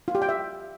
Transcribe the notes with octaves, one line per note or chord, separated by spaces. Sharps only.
F4
G4
G5
E5